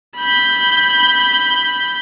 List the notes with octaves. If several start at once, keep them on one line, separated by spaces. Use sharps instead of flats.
B5 G6